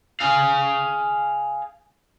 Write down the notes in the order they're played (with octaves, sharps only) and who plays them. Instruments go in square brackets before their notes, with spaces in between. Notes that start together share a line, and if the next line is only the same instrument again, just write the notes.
[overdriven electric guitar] G#4 F5